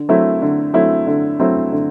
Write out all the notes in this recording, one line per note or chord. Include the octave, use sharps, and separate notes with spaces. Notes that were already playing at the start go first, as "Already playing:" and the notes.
Already playing: D3
F#3 A3 C4 E4
D3
F#3 A3 C4 E4
D3
F#3 A3 C4 E4
D3